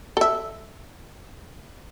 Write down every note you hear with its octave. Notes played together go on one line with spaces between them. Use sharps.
A4 E5